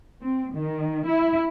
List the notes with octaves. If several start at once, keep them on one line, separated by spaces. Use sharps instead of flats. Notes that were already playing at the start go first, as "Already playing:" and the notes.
C4
D#3
E4